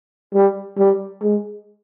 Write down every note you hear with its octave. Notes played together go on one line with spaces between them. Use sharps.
G3
G3
G#3